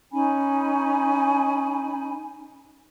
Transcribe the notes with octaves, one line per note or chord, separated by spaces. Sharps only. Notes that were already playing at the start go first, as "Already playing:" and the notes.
C#4 D#4 G#5 B5